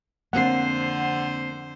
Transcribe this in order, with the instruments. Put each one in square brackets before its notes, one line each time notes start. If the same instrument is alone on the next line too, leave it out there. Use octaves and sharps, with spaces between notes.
[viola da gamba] F2 D3 C5 [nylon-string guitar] A#3 C4 [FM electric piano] F#5 C7